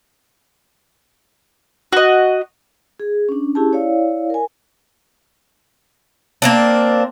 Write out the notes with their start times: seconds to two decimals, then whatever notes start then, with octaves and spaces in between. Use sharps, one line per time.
1.92 F#4 D#5
3.00 G#4
3.29 C#4 D4
3.55 C#4 E4 G4 G#4 A5
3.72 E4 C#5 D5 F5
4.30 A#4 G#5
6.42 A#3 C4 D4